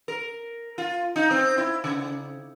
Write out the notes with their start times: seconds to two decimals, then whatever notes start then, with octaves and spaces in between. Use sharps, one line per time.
0.08 A#4
0.78 F4
1.16 D#4
1.31 C4
1.58 E4
1.84 C#3